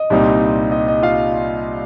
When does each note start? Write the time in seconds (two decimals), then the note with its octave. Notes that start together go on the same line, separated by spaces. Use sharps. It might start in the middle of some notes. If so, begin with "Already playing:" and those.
Already playing: D#5
0.10 C2 A#2 G3 C4 D#4
0.72 D#5
0.88 D#5
1.03 F4 F5